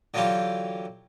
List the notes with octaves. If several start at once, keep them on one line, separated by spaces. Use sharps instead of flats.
D3 E3 F#3 F4 G4